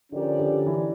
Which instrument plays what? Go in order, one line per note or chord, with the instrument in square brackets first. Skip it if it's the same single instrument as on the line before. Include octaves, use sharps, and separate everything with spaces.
[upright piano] D3 [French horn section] F3 C#4 G4 A#4 D5
[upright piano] D3
E3